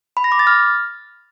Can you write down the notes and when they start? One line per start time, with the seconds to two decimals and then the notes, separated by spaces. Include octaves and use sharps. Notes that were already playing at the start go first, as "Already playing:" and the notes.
0.17 B5
0.24 A#6
0.32 D6
0.39 A6
0.47 F6